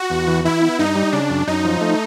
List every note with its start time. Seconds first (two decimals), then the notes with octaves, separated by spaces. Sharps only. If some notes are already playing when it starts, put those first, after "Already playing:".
Already playing: F#4
0.10 E2
0.27 E3
0.45 E3 E4
0.62 B3
0.79 G2 D#4
0.95 G3
1.12 C#3 D4
1.30 F#2
1.47 F#2 D#4
1.65 F3
1.81 A3